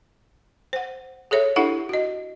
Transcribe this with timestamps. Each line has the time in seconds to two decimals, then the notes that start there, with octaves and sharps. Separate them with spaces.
0.73 C5 F#5
1.31 G#4 A4 C#5 E5
1.56 D4 E4 G4 A4 E5 F#5
1.89 F#4 D#5